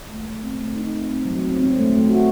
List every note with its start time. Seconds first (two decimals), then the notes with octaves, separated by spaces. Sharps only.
0.09 A3
0.26 A3
0.43 C4
0.59 A3
0.76 D#4
0.93 C4
1.10 C4
1.25 F#3
1.42 C4
1.59 C4
1.76 A3
1.92 A3
2.09 F#4